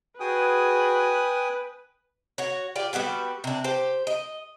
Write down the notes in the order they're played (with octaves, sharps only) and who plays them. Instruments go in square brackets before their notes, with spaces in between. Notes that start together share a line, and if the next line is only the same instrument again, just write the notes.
[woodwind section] F#4 G#4 [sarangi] B4 [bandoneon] G5 G#5 D#6
[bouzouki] F#4 C#5
F4 G4 D5
G3 B3 F#4 G4
C3 D4
G4 C5
D#5